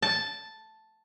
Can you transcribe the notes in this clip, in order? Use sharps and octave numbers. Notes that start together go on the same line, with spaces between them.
A5